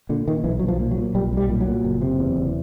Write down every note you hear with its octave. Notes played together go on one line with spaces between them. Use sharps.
A#2 D3
A#2 D#3
B1 E3
B1 F#3
F3
A#2
F#3
A#2
B1 G3
B1 G3
A#2
F#3
A#2
F#1
C3
E2
F#1